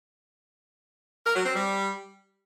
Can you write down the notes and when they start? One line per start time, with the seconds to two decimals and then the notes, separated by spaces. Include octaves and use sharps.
1.26 A#4
1.36 F#3
1.45 C4
1.55 G3